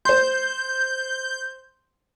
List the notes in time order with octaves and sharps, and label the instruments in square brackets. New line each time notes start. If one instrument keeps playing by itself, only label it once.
[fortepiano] C5 C6 [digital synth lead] G6